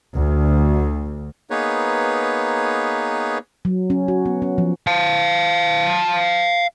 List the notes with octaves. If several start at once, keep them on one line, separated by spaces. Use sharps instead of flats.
D2
A#3 B3 D#4 G#4 B4 C#5
F#3
C#4
F#4
B3
C#4
F3
F5 A5